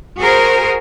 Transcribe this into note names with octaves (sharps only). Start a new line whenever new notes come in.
F#4 G#4 A#4 C5